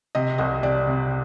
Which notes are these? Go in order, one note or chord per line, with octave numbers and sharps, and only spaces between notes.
C3 D#5
C2 D#5
C3 D5
C3